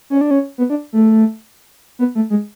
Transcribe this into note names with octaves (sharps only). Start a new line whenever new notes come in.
C#4
D4
C#4
B3
D4
A3
B3
A3
G#3